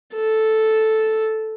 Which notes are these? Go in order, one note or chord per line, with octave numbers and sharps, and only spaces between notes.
A4